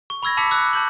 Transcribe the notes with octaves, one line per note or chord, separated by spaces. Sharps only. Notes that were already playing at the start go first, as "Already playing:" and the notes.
C#6
B5 C#6 E6 G#6 A#6
A5 B5 D6 E6 B6 C#7
D6 E6 F#6
A5 G6 F#7